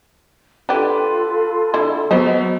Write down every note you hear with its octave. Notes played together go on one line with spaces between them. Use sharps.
D4 F4 G4 A4 B4
D3 E4
F#3 B3 C5 D#5